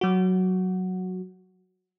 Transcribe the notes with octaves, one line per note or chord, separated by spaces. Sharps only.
F#3 F#4